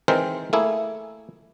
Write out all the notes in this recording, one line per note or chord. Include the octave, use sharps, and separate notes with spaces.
D#3 E3 G#3 C4 A#4 C5
A3 A#3 E4 G#4